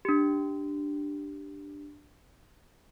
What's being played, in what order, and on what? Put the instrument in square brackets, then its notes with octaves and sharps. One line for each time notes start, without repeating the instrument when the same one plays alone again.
[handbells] D4 G4